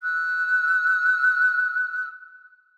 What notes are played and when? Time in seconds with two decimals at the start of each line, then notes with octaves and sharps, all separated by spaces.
0.01 E6 F#6